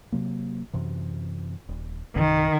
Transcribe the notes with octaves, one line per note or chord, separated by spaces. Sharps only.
C3 F#3 A#3
F#2 C3 E3
D#1
A#1 F#2 C3 D#3